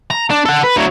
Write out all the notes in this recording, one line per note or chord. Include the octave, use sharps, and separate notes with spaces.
A#5
D4
A4 F#5
B4
D2 F#3